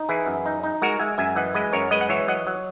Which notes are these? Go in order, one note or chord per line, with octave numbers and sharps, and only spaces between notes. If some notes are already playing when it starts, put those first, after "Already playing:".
Already playing: D#4
E3 E4 G#4
F#2
D#4
D#4
G#3 F#4 A#4
G#3 E5 G#5
F#2 E5 G#5
E3 D#5 F#5
G#3 B4 D#5
F#2 A#4 C#5
G#3 B4 D#5
F#5
E3 C#5 E5
F#3 D#5 F#5
F#3